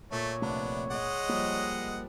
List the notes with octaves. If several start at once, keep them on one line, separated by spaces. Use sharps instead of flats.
A#2 A3 C#5
A#1 C3 A3 B3 D4
G#3 D#5 F#5
F3 G3 A#3